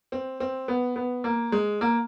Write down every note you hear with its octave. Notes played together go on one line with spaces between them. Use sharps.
C4
C4
B3
B3
A#3
G#3
A#3